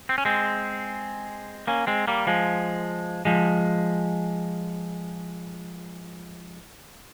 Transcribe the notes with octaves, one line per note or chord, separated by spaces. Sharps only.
C4
C#4
G#3 C4
A#3 C#4
G#3 C4
G3 A#3
F3 G#3
F3 G#3